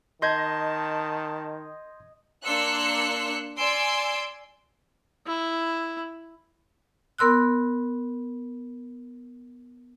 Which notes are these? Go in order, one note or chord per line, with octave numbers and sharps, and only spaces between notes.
D#3 D#5 A5 C6 G6 G#6
A#3 D4 C6 E6 F#6 C#7
D5 G#5 C6 E6 D7
E4
B3 A#4 C6 E6 F#6